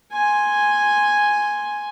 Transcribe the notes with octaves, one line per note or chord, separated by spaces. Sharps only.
G#5 C6